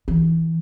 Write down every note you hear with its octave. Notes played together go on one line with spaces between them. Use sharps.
E3